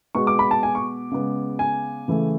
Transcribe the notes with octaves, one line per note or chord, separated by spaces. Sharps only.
B2 G#3 B3 C#6
D6
B5
A5
G#5
C#6
C#3 G#3 B3
G#5
C#3 E3 A3